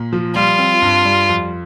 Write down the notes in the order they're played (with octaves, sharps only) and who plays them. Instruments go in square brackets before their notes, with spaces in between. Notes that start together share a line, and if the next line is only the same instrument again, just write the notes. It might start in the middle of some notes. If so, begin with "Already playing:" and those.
Already playing: [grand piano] A#2
F3
[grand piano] G3 [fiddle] F4
[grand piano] C4
G2
G3
F2